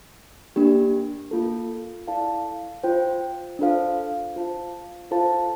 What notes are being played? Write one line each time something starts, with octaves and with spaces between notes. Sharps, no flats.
A#3 D4 G4
A#3 F4 A4
E4 A4 D5 F5 A5
F4 C5 G5
D4 F4 A4 C5 F5
F4 C5 F5 A5
F4 A4 C5 F5 A5